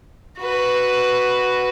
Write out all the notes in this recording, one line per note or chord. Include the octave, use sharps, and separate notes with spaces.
F#4 B4